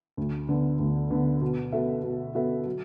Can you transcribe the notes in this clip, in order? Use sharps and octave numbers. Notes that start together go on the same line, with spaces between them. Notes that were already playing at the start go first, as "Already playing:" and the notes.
D2
D3 B3
D2
D3 B3
B2
B3 F#4 A4 E5
B2
B3 F#4 A4 E5
F#3